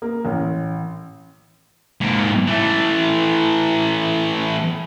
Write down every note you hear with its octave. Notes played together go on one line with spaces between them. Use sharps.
A#3
A1
G#2 A#3
E3 A3